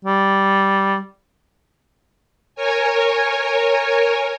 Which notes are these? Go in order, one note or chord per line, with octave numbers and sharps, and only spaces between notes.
G3
A#4 C#5 G#5